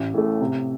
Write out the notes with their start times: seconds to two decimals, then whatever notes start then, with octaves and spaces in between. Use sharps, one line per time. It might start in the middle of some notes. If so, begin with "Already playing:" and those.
Already playing: A1
0.14 A2 A3
0.41 C3